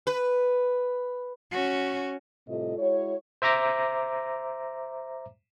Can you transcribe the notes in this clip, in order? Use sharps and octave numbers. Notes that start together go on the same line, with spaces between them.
B4
C#4 F#4
A2 C3 G3 F4 A4 D#5
G#3 E4 F#4 C#5
C5 E5 A#5 D6 A#6